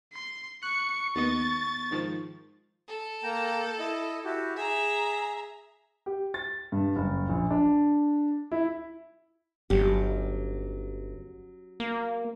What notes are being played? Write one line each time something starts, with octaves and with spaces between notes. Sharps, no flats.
C6
C#6 F#6 C#7
D#2 B3 D#5 A6
G#2 D#3 F3
A4
A#3 G5 A#5
E4 D#5
E4 F#4 G4
G#4 E5 A#5
G4
A6
G2
F#1
A#1
D4
E4
G1 F#3 C#4 G4
A#3